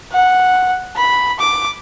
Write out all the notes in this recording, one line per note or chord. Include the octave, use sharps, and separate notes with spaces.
F#5
B5
D6